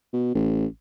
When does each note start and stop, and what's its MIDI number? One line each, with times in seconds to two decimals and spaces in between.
0.13 0.31 47
0.35 0.66 33